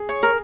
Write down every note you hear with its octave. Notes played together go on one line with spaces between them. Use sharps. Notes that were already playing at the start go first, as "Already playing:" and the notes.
Already playing: G#4
C#5
A#4